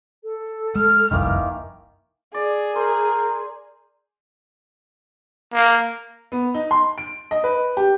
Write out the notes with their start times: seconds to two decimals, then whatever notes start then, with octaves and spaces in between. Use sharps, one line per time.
0.23 A4
0.75 G#3 F6
1.11 F#1 C2 F2 D#3 E3 A#3
2.34 G#4 D5
2.75 A#4 C5
5.54 A#3
6.32 B3
6.54 D#4
6.71 C6
6.98 D7
7.31 D#5
7.44 B4
7.77 G4